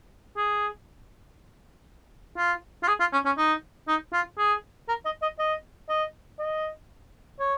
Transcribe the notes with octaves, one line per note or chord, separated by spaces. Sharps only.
G#4
F4
F4
G#4
F4
C#4
C#4
D#4
D#4
F4
G#4
A#4
D#5
D#5
D#5
D#5
D#5
C#5